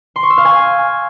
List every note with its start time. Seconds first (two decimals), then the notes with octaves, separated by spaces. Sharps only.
0.16 C6
0.23 C#6
0.30 E6
0.38 F5
0.45 G#5